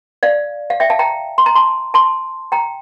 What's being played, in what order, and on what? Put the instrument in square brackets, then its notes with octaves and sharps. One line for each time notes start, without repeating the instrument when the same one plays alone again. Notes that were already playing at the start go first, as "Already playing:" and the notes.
[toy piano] D5 F5
F5
E5 G5
F5 A5
G5 A#5
C6
A#5
A5 C6
A5 C6
G5 A#5